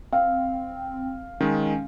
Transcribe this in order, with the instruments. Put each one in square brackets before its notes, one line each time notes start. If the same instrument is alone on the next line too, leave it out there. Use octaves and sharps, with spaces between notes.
[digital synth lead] C4 [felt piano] F5
[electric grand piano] D#3 G#3 [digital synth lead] C#4